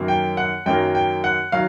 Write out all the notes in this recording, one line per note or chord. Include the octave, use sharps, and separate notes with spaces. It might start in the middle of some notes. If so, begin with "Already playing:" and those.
Already playing: F#2 D#3 F#3 A#3
G5
F#5
F#2 D#3 F#3 A#3 G5
G5
F#5
D#3 F#3 F5